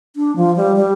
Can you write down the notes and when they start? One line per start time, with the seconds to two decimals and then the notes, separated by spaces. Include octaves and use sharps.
0.16 D4
0.36 F3
0.56 G3
0.76 G3